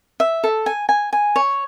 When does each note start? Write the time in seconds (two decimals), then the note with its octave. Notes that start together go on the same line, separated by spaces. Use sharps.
0.20 E5
0.44 A4
0.66 G#5
0.89 G#5
1.13 G#5
1.36 C#5